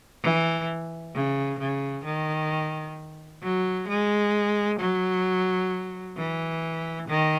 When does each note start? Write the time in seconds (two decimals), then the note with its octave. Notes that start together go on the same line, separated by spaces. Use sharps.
0.23 E3
1.14 C#3
1.60 C#3
2.05 D#3
3.42 F#3
3.88 G#3
4.80 F#3
6.17 E3
7.09 D#3